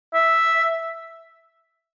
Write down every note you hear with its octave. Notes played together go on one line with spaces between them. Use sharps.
E5